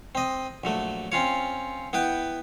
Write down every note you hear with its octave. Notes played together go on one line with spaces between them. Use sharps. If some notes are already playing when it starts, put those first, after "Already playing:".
C4 D#5
A#1 F#3 A3
C4 C#4 F4 C#5
B3 E4 B4 G5